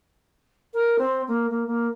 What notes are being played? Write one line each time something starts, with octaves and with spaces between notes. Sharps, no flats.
A#4
C4
A#3
A#3
A#3